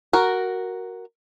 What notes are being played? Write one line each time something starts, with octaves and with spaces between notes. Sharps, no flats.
F#4 A#4